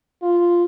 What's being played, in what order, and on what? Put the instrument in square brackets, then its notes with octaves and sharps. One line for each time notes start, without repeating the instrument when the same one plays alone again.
[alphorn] F4